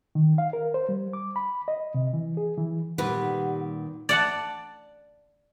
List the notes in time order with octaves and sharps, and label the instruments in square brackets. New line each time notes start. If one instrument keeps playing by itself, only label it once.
[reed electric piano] D#3
F5
A#4
C5
G3
D6
B5
D#5
C3
E3
G#4
E3
[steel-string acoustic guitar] A#2 D#3 [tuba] G3 [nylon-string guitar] B4 [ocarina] F#5
[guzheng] D5 F#5 A5